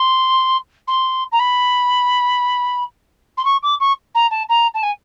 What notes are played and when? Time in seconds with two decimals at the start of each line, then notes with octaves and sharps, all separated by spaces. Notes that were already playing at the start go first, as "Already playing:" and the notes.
Already playing: C6
0.88 C6
1.32 A#5
1.39 B5
3.37 C6
3.45 C#6
3.63 D6
3.80 C#6
4.15 A#5
4.31 A5
4.49 A#5
4.74 A5
4.83 G#5